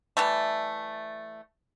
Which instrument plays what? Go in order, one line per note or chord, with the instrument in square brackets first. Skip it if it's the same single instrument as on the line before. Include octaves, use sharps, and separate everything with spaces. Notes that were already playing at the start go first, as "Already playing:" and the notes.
[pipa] E3 G3 A3